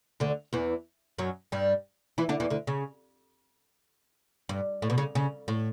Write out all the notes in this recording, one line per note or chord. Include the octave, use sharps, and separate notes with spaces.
D2 D3
E2 E3
F#2 F#3
G2 G3
E3 E4
D3 D4
E2 E3
D2 D3
C#3
G2
A2
B2
C#3
C#3
A2